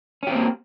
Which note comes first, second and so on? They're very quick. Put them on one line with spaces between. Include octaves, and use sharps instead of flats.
C#4 G4 C4 A#3